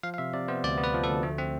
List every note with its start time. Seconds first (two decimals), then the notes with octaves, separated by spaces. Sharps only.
0.03 F3 F5
0.14 F5
0.18 C3 E5
0.33 C3 D5
0.48 B3 C5
0.64 D2 D5
0.78 B3
0.84 B4
0.94 F3
1.04 D2 A4
1.23 A3
1.38 C4